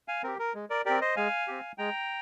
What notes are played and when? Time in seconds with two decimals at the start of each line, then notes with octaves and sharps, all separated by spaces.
0.08 F5 G#5
0.23 C4 G4 A#4
0.39 A#4
0.55 G#3
0.70 A#4 D5
0.85 C4 G4 A#4 D5
1.01 C5 D#5
1.16 G#3 F5 G#5
1.48 C4 G4
1.78 G#3 G5 A#5